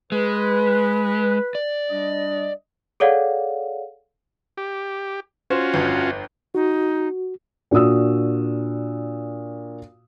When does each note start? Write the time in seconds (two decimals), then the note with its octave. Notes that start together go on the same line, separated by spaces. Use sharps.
0.12 G#3 B4
1.55 D5
1.90 G3 D4 D#5
3.00 G#4 A4 C#5 D5 F5 F#5
4.57 G4
5.50 C#4 F4 F#4 C5
5.74 G1 F2
6.55 D#4 F#4
7.71 A#2 D4 F#4 D#6 E6